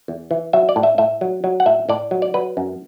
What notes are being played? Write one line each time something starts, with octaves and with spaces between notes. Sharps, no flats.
E2
E3
F#3 E5
D5
A2
E5
A2 E5
F#3
F#3
F#5
A2 E5
A2 D5
F#3
D5
F#3 B4
F#2